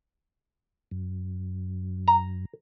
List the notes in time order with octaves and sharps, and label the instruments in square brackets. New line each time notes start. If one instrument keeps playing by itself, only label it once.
[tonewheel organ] F#2
[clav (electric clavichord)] A#5